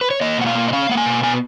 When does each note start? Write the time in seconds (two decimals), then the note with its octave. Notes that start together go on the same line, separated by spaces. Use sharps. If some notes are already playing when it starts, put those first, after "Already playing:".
0.01 B4
0.11 C#5
0.21 A#3 D#5
0.38 B2 F#5
0.46 F5
0.55 A#3
0.68 D#5
0.73 C#4 F5
0.89 A#3 F#5
0.97 G#5
1.06 B2
1.23 B3 G#5